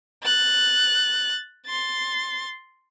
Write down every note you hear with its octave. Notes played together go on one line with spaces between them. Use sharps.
F#6 A6
C6 A6